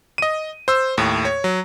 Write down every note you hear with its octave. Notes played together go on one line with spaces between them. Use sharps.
D#5 D#7
C5 E6
D#2 A2
C#5
F#3